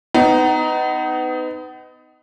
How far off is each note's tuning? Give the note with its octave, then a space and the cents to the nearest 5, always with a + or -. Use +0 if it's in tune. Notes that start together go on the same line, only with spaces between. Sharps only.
B3 +35 D#4 +0